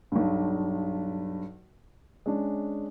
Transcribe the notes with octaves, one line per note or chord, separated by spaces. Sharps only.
B1 G2
G#3 C#4 D4